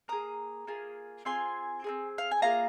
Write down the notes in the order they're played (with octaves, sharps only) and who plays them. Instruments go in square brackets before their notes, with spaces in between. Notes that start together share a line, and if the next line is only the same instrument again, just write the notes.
[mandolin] A#3 G#4 A#5 D#6
A#3 F4 G#4
C4 F4 G#4 G#5 C6
C4 D#4 G#4
F5
G#5
A#3 F4 G#4 F5 A#5